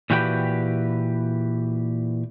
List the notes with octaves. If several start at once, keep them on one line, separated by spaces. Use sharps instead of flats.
A#2 E3 F#4 G4 B4 G5